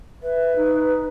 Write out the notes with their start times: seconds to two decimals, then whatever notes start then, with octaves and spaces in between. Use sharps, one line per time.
0.23 B4 E5
0.56 D#4